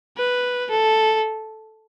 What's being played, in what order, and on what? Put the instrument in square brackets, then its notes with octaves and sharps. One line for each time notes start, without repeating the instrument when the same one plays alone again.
[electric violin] B4
A4